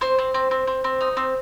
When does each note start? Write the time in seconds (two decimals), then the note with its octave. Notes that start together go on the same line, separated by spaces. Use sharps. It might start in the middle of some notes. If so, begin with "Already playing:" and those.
0.01 C4 C5
0.19 C4
0.34 C4
0.51 C4
0.67 C4
0.84 C4
1.01 D#4
1.17 C4